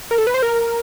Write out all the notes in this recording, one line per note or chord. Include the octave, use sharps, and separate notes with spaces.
A#4
A4
B4
C5
A#4